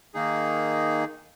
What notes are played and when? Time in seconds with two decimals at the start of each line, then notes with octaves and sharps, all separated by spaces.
0.14 D#3 A#3 D#4 G#4